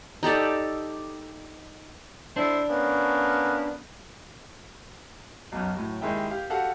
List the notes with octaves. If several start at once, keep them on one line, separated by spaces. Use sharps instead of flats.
D#4 G4 A4 D5
D3 D4 E4 C5
A#3 B3 C#4
B1 F#2
A2 F#3
D#2 D#3 G#3 E4 G5
G4 F5
F#4 G4 A4 F5 F#5